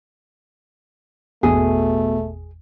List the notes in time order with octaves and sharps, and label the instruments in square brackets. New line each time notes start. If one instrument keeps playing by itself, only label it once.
[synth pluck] G#1 E2 [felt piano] B2 [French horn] A3 [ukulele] G#4